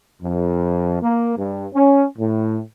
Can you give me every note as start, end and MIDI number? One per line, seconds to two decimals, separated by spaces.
0.22 0.97 41
1.02 1.35 58
1.37 1.66 43
1.74 2.04 61
2.18 2.58 45